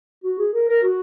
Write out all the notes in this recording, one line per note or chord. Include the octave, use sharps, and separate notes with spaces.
F#4
G#4
A#4
A#4
F#4